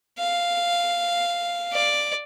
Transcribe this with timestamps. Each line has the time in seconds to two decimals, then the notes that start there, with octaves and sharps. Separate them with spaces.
0.19 F5
1.73 D5